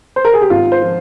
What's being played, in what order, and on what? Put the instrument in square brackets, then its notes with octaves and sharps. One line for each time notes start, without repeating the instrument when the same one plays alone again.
[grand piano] C5
A#4
G#4
G4
G#1 F4
C5
F3